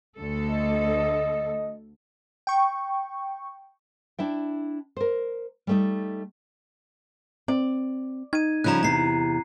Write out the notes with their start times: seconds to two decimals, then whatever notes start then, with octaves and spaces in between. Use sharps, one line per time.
0.17 D2 A4
0.50 D#5
2.47 G5 C#6
4.19 D4 E4 E5 G5
4.97 A#4 C5
5.67 G3 A3 D#4
7.48 C4 D5
8.33 D#4 G#6 D#7
8.64 C#3 F3 G3 A#5 F#6
8.83 E2 C3 A#5 C7